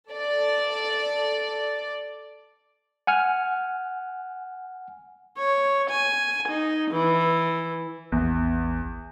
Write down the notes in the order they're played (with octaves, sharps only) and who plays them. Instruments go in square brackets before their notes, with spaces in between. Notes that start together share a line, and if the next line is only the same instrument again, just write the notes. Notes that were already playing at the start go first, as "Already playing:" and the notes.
[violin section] A4 D5
[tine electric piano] F#5 G#5 F6
[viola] C#5
G#5
D#4
E3
[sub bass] A1 [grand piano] E2